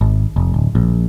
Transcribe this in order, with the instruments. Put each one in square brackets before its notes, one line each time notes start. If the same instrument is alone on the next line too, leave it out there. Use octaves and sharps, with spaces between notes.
[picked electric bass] G#1
F1
D1
A#1